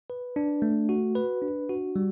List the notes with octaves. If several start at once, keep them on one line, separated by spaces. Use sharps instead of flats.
B4
D4
A3
F#4
B4
D4
F#4
G3